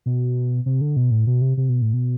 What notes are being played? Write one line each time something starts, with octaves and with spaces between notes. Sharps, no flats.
B2
C3
D3
B2
A2
B2
C3
C3
B2
A2
B2